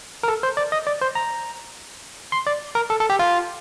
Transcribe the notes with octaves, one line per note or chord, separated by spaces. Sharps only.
A#4
A4
C5
D5
D#5
D5
C5
A#5
C6
D5
A#4
A4
A4
G4
F4